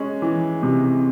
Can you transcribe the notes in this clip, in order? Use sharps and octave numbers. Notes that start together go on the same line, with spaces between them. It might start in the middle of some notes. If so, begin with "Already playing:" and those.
Already playing: G#3 C#4
E3
C3